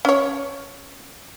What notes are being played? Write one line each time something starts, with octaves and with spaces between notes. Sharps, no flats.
C#4 C#5